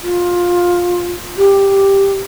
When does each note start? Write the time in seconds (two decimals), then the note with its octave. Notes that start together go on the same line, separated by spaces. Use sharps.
0.02 F4
1.37 G4